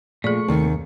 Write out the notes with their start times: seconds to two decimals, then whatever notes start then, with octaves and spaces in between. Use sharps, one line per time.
0.24 A#2 F3 A3 G#4 D5 C#6
0.48 D#2 C3 D#3